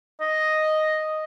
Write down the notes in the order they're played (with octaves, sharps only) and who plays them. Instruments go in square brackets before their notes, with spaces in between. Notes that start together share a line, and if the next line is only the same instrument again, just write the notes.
[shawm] D#5